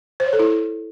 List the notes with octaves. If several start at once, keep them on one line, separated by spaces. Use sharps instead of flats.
C5
C#5
A4
E4